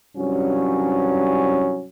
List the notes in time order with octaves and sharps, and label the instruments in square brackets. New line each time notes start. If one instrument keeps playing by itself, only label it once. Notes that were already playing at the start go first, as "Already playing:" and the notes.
[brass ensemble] C2 G2 F#3 C#4